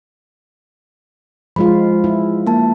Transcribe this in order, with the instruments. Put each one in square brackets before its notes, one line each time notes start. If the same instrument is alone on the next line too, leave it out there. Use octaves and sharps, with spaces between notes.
[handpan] F3 G#3 F4 [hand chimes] B5
[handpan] E4
[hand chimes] A#3 A5